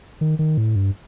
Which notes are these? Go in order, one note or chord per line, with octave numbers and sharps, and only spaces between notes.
D#3
D#3
A2
G2